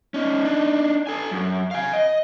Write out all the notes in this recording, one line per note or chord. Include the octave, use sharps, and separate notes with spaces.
C#4 D#4
D4 D#4
A4 G#5
F#2
F5 G#5
D#5